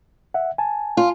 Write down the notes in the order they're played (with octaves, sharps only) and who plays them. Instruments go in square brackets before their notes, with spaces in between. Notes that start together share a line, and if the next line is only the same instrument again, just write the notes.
[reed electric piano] E5 F#5
G#5 A5
[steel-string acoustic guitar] F4